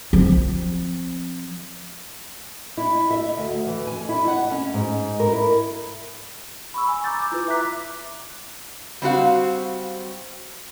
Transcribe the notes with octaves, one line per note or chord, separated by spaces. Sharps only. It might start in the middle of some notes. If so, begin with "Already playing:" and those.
F3 C4
E4
E5
D2
E3
G#5
E4
F#5
C#4
G#2
A#4
E4
B5 C#6 E6
G#5
A#5 D6 E6 G6 A6
E4 F4 B4 D6
E5 A#5 D6 F#6 B6
G3 C4 F#4 F5